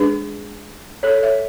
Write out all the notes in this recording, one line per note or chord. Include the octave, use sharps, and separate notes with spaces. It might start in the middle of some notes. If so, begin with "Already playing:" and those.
Already playing: G#3 D4 G#4 B4
A4 C#5
C#5 E5